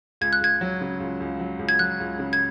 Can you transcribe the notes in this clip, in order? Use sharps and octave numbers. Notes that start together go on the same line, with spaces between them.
C#2 G#6
F#6
C#2 G#6
F#3
C#3
C#2
C#2
F#3
C#2
G#6
F#3 F#6
C#2
C#3
G#6